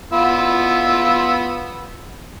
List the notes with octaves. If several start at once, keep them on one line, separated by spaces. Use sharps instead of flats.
B3 F4 E6